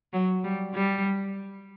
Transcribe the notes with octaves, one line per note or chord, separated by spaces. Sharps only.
F#3
G3
G3